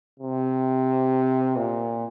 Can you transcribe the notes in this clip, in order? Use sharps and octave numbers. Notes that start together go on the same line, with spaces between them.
C3
A#2